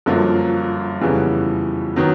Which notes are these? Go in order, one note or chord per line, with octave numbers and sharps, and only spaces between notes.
G1 F#2 D3 F3 A#3
F2 C#3 E3 G3 B3
D#3 F#3 B3